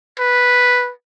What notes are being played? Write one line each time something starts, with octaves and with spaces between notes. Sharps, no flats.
B4